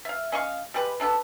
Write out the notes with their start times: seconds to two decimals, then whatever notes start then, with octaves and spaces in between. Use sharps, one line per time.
0.05 E5 F5
0.32 C#4 D#5 F5 C#6
0.74 G3 G#3 G4 B4
1.00 B2 D4 A4 B4